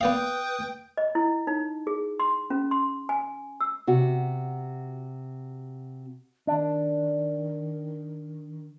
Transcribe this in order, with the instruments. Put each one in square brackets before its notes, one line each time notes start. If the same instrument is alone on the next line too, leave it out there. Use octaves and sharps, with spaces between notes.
[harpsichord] B3 D5 F5 [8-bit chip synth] B4 D#6 [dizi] G5
[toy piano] D#5
E4
D#4
G#4
C6
C#4
C6
G#5
E6
[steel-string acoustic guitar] C3 F#4
[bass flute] D#3 [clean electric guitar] D4